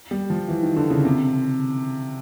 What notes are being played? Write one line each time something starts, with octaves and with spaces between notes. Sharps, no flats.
G3
F3
E3
D#3
D3
C#3
C3